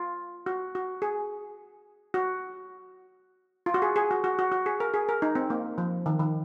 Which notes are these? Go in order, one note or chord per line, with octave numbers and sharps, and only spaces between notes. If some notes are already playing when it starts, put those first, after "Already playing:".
Already playing: F4
F#4
F#4
G#4
F#4
F4
F#4
G#4
G#4
F#4
F#4
F#4
F#4
G#4
A#4
G#4
A#4
D#4
C4
A#3
F3
D#3
D#3